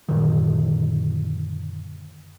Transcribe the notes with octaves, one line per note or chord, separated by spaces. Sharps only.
F#2 A#2 D3 D#3